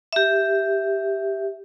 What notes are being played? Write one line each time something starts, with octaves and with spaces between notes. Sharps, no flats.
G4 E5